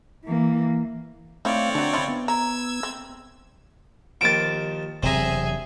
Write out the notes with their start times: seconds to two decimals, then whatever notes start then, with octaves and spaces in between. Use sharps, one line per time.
0.25 E3 A#3
1.45 A3 C4 D#4 E4 C#5 D5 F5
1.75 D3 F3 F#3 D4
1.93 F3 E4 F4
2.09 B3
2.28 A#5 E6 G#6
2.83 C4
4.21 D#2 F3 A6 D7
5.03 E1 C3 F#3 C4 G#4 E5 A#5